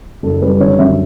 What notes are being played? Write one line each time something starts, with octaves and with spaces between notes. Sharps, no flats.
F#1 A4
G3 B4
D3 C#5
F#2 E5